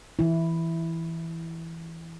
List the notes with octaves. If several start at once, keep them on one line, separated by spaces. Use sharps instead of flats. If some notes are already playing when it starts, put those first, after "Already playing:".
E3 E4